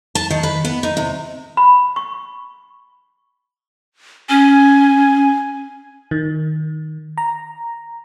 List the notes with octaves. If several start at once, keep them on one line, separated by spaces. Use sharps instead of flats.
A5
D#3
B4
B3
D#4
C3
B5
C#6
C#4 G#5
D#3
A#5